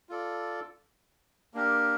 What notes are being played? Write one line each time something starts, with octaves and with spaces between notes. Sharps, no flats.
F4 A4 D5
A#3 D4 G4 A#4